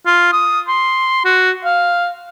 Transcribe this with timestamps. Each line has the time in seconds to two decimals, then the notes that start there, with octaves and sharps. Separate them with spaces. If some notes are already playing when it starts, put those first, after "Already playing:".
0.06 F4
0.33 D#6
0.68 C6
1.25 F#4
1.64 F5